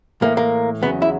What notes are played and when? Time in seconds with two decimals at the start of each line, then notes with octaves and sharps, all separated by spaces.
0.22 A2 E3 A#3
0.37 A#3
0.82 E2 C#3 F#3 B3
1.02 E4